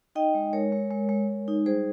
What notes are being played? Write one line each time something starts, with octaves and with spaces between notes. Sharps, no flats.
D#4 D#5 G5
G#3
G#3 A#4 C#5
G#3
G#3
G#3
G#3
D#4
G3 G#4 C5